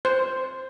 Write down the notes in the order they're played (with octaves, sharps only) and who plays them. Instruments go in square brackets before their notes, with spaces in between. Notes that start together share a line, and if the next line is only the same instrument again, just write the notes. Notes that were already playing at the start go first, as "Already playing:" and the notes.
[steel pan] C5